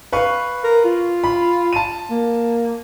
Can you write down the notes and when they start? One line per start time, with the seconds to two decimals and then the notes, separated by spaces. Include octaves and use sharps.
0.12 B4 F5 C#6
0.64 A#4
0.84 F4
1.24 B5
1.73 A5 D#7
2.11 A#3